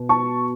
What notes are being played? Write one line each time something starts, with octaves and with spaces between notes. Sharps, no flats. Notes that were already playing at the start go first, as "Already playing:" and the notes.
Already playing: B2 B3
A5 C#6